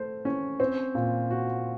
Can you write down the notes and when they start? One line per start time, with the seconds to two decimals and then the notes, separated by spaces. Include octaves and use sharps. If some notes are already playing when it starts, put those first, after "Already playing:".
Already playing: A3 C5
0.25 C#4
0.60 C4
0.95 A#2
1.30 F#4